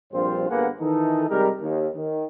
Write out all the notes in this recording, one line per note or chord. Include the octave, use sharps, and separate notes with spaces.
A#1 G2 F3 C4 F4 C5
G1 A#3 B3 G#4 B4 F#5
D#3 E3 D#4 A4
C3 G3 G#3 G4 A#4
D#2
D#3